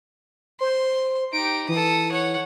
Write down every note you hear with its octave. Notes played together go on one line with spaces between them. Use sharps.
C5 C6
D#4 G4 D7
E3 A4 D#6
C#5 F#5